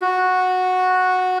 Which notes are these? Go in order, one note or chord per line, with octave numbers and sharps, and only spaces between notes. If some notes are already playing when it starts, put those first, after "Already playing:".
F#4